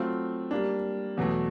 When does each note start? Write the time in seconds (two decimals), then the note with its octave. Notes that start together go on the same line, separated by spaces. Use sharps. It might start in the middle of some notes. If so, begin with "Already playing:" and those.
Already playing: F#3 A3 C4 F4
0.51 G3 A#3 D4
1.17 E2 B2 F#3 A3